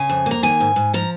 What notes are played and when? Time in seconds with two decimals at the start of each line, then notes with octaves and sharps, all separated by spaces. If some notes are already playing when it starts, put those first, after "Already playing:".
Already playing: C#3 G#5
0.09 F2
0.26 A#3 A#5
0.43 D#3 G#5
0.60 G#2
0.76 G#2
0.94 F3 A#5